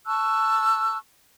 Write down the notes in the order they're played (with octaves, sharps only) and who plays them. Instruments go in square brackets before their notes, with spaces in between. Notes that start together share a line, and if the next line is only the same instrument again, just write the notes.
[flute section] A5 C#6 E6 F#6